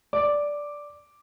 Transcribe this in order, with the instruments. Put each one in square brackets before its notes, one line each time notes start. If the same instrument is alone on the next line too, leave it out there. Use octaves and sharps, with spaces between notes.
[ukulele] D5 [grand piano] D6